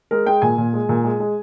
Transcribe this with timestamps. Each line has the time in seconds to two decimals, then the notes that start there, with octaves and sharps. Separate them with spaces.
0.11 G#3 A#4
0.26 G#3 G5
0.42 A#2 G#5
0.58 A#2
0.73 G#3
0.89 A#2
1.04 G#3
1.20 G#3